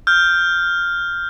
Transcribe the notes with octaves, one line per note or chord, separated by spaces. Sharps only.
F6 G6